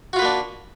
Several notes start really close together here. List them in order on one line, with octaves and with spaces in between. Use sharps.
F#4 F4 B4 A#3 D4